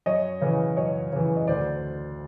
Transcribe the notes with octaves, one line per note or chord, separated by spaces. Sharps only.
F#2 C#5 D#5
C#3 E3
F#2 C#5 D#5
C#3 E3
D#5
D2 C5 D5